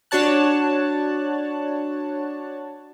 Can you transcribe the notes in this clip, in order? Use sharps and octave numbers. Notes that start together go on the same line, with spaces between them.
D4 F#4 C#5 A5 F#6